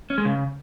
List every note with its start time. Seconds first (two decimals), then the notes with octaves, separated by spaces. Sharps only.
0.10 C#4
0.18 G#3
0.25 C#3